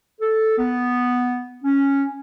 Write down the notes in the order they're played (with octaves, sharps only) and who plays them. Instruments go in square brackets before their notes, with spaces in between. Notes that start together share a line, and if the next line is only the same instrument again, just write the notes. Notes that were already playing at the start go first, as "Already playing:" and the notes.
[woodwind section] A4
B3
C#4